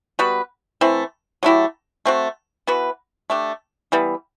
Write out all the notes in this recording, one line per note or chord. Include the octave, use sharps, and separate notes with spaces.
G3 B3 F#4 B4
E3 A3 C4 E4
F#3 A3 E4 G4
A3 C4 F#4
E3 B3 F#4 B4
A3 D4 G4
E3 G3 B3